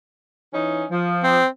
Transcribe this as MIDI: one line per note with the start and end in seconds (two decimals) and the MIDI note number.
0.53 0.84 52
0.53 0.84 61
0.53 0.84 63
0.91 1.38 53
1.24 1.47 60